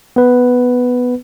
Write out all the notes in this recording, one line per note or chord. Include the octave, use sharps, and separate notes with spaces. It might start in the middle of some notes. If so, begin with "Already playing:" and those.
B3 B4